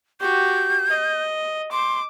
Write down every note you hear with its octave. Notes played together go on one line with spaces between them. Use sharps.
F#4 G4 G6
D#5
C6 D6